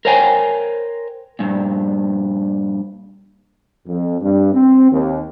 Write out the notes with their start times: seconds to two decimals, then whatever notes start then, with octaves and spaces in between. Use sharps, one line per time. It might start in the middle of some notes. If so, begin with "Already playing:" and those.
0.05 A#4 C5 C#5 F5 G5 G#5
1.39 G2 A#2
3.87 F2
4.21 G2
4.53 C4
4.92 D#2